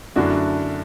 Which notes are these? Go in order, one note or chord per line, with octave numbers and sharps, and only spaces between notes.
F#2 D3 A3 D4 E4 F#4